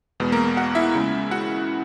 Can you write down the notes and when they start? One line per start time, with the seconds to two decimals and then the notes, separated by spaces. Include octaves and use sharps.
0.20 E2 B2 G#3 B3
0.32 A#3 A#4
0.57 F#4 F#5
0.75 E4 E5
0.94 C#2 C#3 G#3
1.31 F#4 F#5